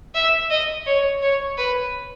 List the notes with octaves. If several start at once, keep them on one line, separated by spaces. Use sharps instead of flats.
E5
D#5
C#5
C#5
B4